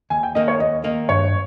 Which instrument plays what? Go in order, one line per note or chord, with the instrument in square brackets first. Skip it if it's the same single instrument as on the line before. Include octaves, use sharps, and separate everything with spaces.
[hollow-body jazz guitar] D#2 [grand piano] G#5
[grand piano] G5
[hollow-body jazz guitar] D#3 A#3 D#4 [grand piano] D#5
[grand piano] C#5
[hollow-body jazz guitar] D#2 [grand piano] D#5
[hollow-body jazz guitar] D#3 A#3 D#4
[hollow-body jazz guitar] G2 [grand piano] C#5